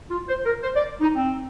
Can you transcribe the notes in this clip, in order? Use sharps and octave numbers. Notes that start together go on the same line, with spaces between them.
F4
C5
A#4
C5
D5
D#4
C4